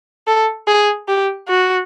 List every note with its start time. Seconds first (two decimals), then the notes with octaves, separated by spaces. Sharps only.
0.27 A4
0.67 G#4
1.08 G4
1.48 F#4